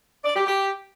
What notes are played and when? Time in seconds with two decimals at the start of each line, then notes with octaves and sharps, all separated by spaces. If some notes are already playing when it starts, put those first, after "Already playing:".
0.24 D5
0.36 G4
0.47 G4